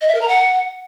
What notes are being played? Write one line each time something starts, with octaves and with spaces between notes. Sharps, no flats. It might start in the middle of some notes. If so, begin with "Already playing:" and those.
D#5
E5
A#4
A#5
F#5